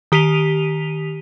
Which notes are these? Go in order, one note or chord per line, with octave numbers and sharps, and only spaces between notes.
D#3 G4 B6 D#7 F7